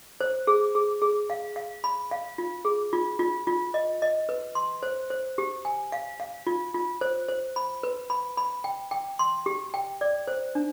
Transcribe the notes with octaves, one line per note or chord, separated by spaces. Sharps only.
C5
G#4
G#4
G#4
F5
F5
B5
F5
F4
G#4
F4
F4
F4
D#5
D#5
B4
C6
C5
C5
G4
G#5
F5
F5
F4
F4
C5
C5
B5
B4
B5
B5
G5
G5
C6
G4
G5
D5
C5
D4